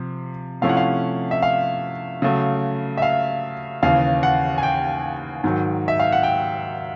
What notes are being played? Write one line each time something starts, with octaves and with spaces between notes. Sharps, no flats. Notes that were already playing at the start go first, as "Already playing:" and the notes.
Already playing: C3 F3
C3 F3 A3 C#4 E4 F5
F#5
F5
E5
F5
C#3 F#3 A3
E5
F5
D#2 C#3 E3 F5
F#5
G#5
G5
G#2 D#3 F#3
E5
F5
F#5
G5